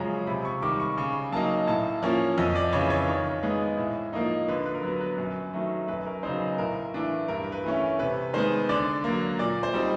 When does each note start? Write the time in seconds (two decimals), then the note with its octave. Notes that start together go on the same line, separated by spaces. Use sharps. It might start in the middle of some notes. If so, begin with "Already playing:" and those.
Already playing: F#2 C#3 F3 G#3 C#4 A#5
0.27 C3 B5
0.45 C#6
0.62 D#3 G3 D6
0.80 C#6
0.97 C#3 C#6
1.32 F#3 A#3 D#4 A5
1.67 A2 A5
2.03 F3 A#3 C#4
2.38 F2 D#5
2.55 D5
2.73 C#3 E3 C#5
2.90 C#5
3.08 D#3 C#5
3.43 G#3 B3 D#4
3.77 A2
4.13 F3 A#3 D#4
4.48 D3 B4
4.66 B4
4.75 A#4
4.83 F#3 B3 B4
5.00 B4
5.18 F#2
5.53 D#3 F#3 A3
5.88 F#2 B4
6.06 A#4
6.23 C#3 F#3 B3 D#4 C5
6.58 A2 A#4
6.94 E3 A3 D4
7.28 G2 A#4
7.52 B4
7.64 E3 A3 C#4
7.99 C3 B4
8.33 D#3 G#3 B3 C5
8.69 D3 D5
9.04 F#3 A#3
9.39 A#2 D5
9.63 C5
9.74 G3 C4 D#4